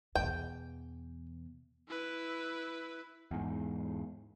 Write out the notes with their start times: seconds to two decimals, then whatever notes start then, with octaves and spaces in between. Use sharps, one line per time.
0.15 E2 B2 G5
1.88 E4 B4
3.31 E2 G#2